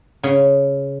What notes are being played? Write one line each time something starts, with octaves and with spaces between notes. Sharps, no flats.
C#3